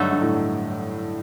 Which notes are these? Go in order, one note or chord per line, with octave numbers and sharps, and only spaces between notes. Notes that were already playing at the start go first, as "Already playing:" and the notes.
Already playing: G2 D3 F#3 A3 D#4 A4
G2
A2